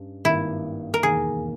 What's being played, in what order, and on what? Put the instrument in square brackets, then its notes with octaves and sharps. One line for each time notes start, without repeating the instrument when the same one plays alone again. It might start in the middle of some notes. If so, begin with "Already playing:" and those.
Already playing: [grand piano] G2 G3 C#4
[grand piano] G#1 G2 D#3 A#3 [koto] E4
[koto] A#4
[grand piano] E1 D#2 D#3 A#3 [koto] G#4